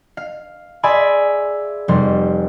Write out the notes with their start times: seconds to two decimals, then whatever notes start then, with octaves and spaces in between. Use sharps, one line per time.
0.17 F5
0.83 G#4 D5 E5 G#5 B5 C6
1.88 F1 G3 C6